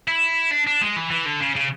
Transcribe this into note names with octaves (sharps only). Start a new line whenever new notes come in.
E4
D4
D4
G#3
E3
E3
D3
C#3
C#3